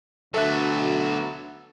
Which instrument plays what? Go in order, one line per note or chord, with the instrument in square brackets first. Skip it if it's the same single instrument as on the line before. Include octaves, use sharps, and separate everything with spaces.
[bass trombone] D2 [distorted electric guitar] F#3 B3 [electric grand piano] A4 E5 F#6